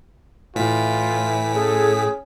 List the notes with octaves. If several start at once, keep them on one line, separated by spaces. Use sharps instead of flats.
A2 E3 F4 B6
C#4 G#4 A4